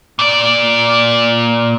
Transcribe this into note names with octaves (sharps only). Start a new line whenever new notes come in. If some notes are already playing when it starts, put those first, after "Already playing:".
A#2 D5